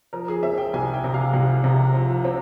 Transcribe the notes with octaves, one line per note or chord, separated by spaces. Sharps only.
F3 A#4
G#4
C4 E5
G5
C2 G#5
G5
C3
F5
C2
C3
F3
C4